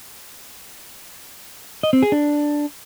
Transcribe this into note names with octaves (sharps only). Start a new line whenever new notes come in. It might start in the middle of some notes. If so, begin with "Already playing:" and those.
D#5
C4
G#4
D4